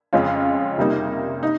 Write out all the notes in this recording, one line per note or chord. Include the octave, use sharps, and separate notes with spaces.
F2 C#3 G#3 C#4 F4
C3 G3 A#3 D#4
D#4